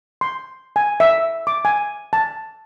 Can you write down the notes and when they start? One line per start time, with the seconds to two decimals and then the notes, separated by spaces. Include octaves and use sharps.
0.21 C6
0.76 G#5
1.00 E5
1.47 D6
1.65 G#5
2.13 A5